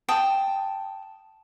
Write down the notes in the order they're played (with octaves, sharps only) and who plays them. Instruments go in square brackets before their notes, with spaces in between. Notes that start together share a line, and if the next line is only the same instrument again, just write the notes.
[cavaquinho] G5 A5 D#6